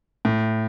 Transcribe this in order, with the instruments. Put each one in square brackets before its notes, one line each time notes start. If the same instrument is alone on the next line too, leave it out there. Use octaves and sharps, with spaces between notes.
[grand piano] A2